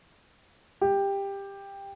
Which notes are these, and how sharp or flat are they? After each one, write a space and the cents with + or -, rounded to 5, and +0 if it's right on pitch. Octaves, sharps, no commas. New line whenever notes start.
G4 +15